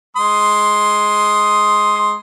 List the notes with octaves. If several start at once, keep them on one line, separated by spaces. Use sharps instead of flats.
G#3 C6 D#6